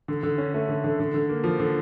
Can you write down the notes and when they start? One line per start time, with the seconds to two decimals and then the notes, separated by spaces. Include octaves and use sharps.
0.08 D3
0.23 D3
0.38 C#4
0.54 A3
0.69 D3
0.84 D3
1.00 D3
1.14 D3
1.29 A#3
1.44 F3
1.60 D3